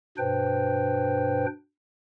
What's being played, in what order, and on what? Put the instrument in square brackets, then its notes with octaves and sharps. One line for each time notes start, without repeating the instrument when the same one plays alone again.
[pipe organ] G2 B2 D4 B4 C5 G5